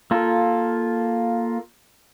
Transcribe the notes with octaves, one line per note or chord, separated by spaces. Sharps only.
A#3 F4 A4